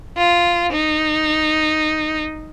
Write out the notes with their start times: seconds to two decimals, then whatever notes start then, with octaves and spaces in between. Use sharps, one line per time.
0.17 F4
0.72 D#4